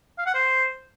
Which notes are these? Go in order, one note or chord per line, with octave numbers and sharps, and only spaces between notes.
F5
F#5
C5